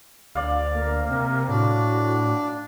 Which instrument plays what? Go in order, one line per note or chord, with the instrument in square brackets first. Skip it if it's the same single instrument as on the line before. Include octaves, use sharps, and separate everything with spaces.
[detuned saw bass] D2 [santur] D5 F5
[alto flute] A#3
[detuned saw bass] C3
[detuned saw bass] A2 [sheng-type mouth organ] D4 [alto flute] F#4